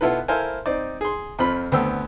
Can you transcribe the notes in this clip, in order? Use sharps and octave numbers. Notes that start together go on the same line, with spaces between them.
B2 B3 E4 F4 A4 B4
E4 A4 A#4 C5 F5 G#5
C4 D#4 D5
G#4 C6
F2 C4 F4 B5
D2 B3 C4 A4 G5 E6